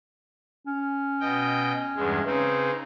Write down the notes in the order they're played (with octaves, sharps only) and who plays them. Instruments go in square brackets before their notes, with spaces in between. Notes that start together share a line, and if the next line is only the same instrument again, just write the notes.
[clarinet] C#4
[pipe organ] B2 D#5 G5
E2 G2 G#3
[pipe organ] C#3 C4 D#4 [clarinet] B4